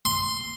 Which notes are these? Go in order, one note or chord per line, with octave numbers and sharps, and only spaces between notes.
C6